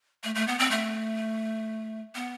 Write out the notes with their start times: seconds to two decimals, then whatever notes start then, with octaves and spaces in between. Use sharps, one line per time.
0.24 A3
0.35 A3
0.48 B3
0.59 C4
0.71 A3
2.15 B3